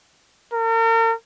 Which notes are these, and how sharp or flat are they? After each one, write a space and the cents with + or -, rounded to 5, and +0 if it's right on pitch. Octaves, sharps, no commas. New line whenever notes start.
A#4 -40